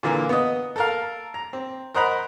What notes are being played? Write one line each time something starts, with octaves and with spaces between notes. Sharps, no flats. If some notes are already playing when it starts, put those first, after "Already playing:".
A#2 D3 E3 A#3
B3 D#5
A4 A#4 F5
A#5
C4
A#4 C5 D#5 F#5 A#5 B5